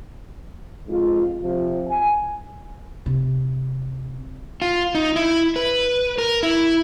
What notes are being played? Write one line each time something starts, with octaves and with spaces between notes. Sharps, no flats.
F2 G#2 F4
C3 F3
G#5
C3
F4
D#4
E4
B4
A#4
E4